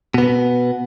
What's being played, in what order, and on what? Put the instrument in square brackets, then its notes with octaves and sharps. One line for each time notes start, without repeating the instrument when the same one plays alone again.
[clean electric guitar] B2 B3